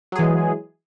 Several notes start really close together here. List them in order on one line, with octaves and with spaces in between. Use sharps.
F#3 G#4 E3 G#3